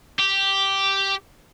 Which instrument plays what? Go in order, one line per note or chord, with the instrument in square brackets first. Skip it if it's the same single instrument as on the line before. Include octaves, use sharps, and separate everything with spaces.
[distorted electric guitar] G4